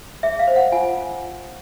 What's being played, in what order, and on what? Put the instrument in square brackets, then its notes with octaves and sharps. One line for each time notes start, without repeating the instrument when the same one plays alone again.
[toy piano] G#4 E5
F5
C5
F#5
F4 G#5